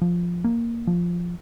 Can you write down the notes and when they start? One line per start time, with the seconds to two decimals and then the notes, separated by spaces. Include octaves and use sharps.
0.01 F3
0.44 A#3
0.87 F3